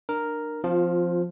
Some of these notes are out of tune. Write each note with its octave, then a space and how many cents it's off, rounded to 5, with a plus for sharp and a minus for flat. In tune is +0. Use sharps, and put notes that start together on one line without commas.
D4 +35 A#4 +0
F3 +0 C4 +0 F4 +25